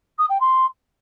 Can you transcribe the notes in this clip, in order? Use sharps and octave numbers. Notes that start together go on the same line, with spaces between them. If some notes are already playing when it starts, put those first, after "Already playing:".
D#6
G5
C6